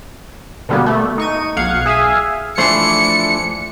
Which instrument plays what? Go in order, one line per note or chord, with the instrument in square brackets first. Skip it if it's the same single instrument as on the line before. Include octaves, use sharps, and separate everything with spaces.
[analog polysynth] B2 D3 G3 A#3 B3
A3
D#4 C#6 D#7
B1 F5 F#5 G#6 C#7
G#4 E5 F5 G#5
[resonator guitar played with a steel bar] E3 C5 [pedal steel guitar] F3 A3 D4 [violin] C#7